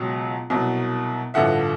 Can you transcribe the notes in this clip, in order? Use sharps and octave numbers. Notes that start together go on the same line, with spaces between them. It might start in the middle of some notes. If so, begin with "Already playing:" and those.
Already playing: C#2 B2 F#3
C2 B2 F#3
A1 G2 D3 F3 E5 F#5